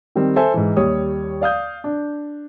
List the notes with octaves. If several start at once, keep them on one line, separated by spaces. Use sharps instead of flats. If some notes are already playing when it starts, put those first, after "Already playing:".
D#3 G3 C4
A4 C5 E5 G#5
G#2 E3
D#2 G3 C#5 D#6
D5 F5 D#6 G6
D4